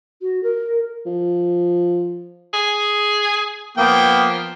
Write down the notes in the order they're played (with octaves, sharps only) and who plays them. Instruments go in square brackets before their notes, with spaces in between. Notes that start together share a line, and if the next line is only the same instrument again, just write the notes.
[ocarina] F#4
A#4
[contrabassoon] F3
[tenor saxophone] G#4
[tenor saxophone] F3 [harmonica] A#3 B3 G5